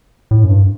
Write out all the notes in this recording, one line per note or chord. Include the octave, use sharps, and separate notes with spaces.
A2
F#2
G2